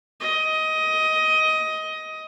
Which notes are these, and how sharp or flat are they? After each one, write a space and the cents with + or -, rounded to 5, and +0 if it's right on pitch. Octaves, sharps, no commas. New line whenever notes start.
D#5 +15